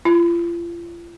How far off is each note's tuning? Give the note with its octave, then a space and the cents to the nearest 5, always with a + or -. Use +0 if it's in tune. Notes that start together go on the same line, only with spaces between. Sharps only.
F4 -35